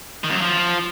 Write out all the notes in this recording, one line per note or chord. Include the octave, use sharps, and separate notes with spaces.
D#3
F#2
F#3
F3